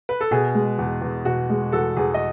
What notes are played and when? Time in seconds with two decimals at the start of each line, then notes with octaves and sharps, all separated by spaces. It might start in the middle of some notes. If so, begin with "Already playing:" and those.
0.09 B4
0.21 A4
0.31 B2 G#4
0.55 G#3
0.79 E2
1.01 E2
1.25 B2 F#4
1.50 G#3
1.72 E2 F#4 A4
1.96 E2 G#4
2.14 D#5